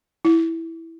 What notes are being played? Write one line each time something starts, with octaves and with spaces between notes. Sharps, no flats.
E4